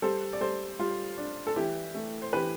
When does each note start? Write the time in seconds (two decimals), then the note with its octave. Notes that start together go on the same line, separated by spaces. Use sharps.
0.02 G3 A4 C5
0.33 D5
0.40 G3 A4 C5
0.79 G3 F4
1.18 D4
1.47 A4
1.56 E3 E4 G4
1.95 A3
2.22 C5
2.33 E3 G4 B4